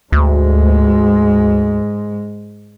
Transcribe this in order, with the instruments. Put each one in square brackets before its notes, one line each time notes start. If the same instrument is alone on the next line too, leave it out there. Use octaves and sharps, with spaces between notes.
[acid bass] D2 [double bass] G#2 G#3